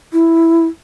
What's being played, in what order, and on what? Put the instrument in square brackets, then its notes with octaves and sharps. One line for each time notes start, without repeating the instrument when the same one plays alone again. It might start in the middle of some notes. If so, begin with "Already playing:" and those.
[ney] E4